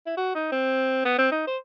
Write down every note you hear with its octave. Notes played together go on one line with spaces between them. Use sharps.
E4
F#4
D#4
C4
B3
C4
D#4
C5